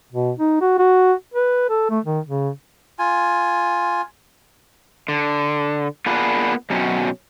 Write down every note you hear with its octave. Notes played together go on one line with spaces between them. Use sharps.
B2
D#4
F#4
F#4
B4
A4
A3
D#3
C#3
F4 G#5
D3
A#3 B3 D4 F4 G#4 B4
F#2 B2 F#3 C4 C#4